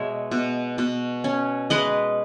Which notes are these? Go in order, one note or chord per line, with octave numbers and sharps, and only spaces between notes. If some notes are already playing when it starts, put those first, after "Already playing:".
Already playing: B2 G#3 C#5 E5
B2
B2
C#4
G#3 B4 D#5